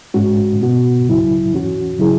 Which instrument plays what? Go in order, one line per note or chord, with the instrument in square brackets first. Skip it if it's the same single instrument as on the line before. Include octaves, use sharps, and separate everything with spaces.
[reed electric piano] G#2 G#3 C#4 F#4
B2 B3 F#4
C#2 C#3 F#3 E4
E2 E3 C#4 F#4
C#3 F#3 E4 G#4